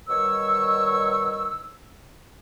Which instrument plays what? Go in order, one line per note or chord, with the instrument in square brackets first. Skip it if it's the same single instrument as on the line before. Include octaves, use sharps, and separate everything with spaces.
[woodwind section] B2 D#3 G3 C#5 C#6 E6